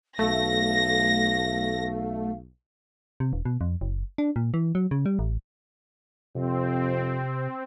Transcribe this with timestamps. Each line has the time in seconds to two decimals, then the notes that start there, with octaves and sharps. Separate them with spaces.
0.19 B1 A3 F5 A#6
3.20 C3
3.33 E1
3.45 B2
3.61 F2
3.81 F#1
4.18 D4
4.36 A#2
4.54 E3
4.75 F#3
4.91 C#3
5.06 G3
5.19 A1
6.35 F2 C3 C4